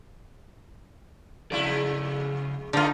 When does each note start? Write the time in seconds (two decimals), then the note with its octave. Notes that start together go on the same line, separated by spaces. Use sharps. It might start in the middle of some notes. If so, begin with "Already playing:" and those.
1.52 F2 C#3 G#3 E4 D5
2.73 D3 A3 B3 D#4 F4